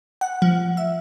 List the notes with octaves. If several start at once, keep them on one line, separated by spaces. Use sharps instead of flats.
F#5
F3
E5